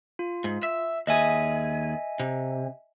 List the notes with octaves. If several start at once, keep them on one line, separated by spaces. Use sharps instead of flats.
F4
G#2
E5
D#2 G#4 D#5 E5 G#5
C3